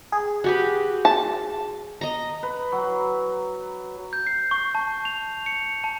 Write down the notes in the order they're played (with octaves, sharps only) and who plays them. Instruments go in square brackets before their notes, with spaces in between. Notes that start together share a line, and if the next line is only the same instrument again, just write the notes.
[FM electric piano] G#4
[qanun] F#4 G4 B4
[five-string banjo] A5
[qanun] D#5 A#5
[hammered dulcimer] B4
F#3
[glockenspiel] G6
C7
C#6
A5
F7
C#7
A5